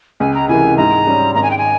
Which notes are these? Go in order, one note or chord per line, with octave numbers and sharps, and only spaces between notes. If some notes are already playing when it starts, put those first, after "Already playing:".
C#2 G#5
A#5
C3 E3 A#3 E4 G#5
G#2 A#5
G3 C#4
G#1 A#5
G#5
G5
G#5